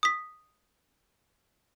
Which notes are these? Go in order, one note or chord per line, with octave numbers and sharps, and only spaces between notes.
D#6 B6